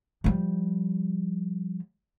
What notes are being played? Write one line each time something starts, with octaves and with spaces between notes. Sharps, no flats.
F3 G3